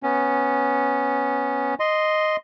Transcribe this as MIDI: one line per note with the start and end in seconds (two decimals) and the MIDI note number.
0.03 1.75 59
0.03 1.75 61
1.80 2.36 75
1.80 2.36 84